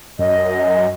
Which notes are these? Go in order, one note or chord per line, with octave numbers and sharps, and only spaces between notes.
F#2 D#5